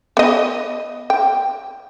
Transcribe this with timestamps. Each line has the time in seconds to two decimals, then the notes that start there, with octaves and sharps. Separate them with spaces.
0.17 B3 D#5
1.10 G5